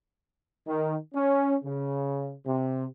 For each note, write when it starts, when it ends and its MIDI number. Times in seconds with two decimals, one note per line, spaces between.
0.67 0.95 51
1.14 1.56 61
1.64 2.35 49
2.45 2.85 48